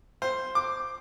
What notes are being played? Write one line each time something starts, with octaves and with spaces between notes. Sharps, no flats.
C5
D6